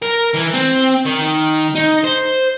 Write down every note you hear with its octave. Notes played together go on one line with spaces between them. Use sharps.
A#4
E3
C4
D#3
D#4
C5